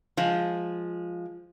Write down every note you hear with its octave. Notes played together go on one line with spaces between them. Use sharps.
F3 G#3